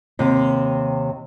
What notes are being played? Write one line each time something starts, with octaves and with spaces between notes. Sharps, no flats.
D#2 C3